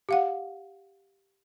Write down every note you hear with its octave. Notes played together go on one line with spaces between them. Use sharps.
G4 F5 F#5